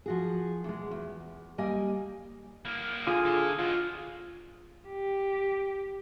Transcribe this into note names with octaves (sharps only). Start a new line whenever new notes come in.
F3 F#4 G#4
E2 B2 G#3
E2
G3 A#3 D#5 G#5
A#3 E4
D3 F4 G#4 G#5
E4 A4
G#3 F4 F#4
G4